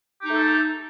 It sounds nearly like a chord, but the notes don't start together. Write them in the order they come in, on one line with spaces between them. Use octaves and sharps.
G4 D#4 A3 A4